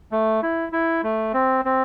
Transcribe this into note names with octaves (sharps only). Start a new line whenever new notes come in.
A3
E4
E4
A3
C4
C4